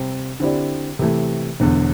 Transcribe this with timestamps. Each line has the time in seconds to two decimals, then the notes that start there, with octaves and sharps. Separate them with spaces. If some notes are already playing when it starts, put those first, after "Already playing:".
Already playing: C3 G3 C4
0.40 D3 C4 E4 G4 D5
0.99 C3 E3 A3
1.60 E1 E2 D3